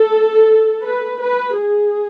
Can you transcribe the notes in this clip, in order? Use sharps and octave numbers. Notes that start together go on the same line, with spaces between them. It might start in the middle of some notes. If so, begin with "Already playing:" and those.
Already playing: A4
B4
B4
G#4